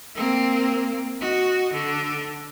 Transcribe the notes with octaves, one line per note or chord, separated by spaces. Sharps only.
A#3 C4
F#4 D#5
D3 D4